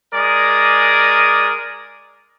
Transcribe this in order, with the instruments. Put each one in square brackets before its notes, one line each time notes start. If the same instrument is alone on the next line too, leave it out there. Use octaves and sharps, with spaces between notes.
[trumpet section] G#3 A#4 D5 D#6